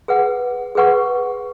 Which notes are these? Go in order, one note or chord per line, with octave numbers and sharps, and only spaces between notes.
G#4 B4 F#5
G#4 B4 F#5 C#6